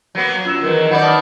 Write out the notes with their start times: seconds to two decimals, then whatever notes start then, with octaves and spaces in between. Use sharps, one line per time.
0.15 F#3 A#3 B3
0.45 F#2 F4 E6 E7
0.62 E2 D#3 F#3 A#4 B4
0.91 D#3 F4 D5 F#5 B5 G6
1.03 A5 D#6 F6